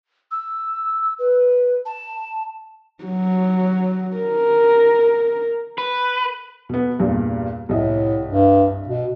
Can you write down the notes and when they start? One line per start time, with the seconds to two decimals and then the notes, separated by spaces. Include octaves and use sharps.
0.31 E6
1.19 B4
1.86 A5
3.04 F#3
4.17 A#4
5.78 B4
6.69 B2 B3
6.99 E2 G2 A#2
7.69 C2 A2 D#5 E5
8.27 G2
8.88 B2